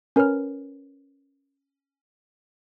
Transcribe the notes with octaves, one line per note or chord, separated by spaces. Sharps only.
C#4 A#4 B4 C#5 F6